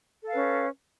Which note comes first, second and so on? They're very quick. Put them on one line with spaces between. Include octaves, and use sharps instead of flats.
A4 F5 B4 C#4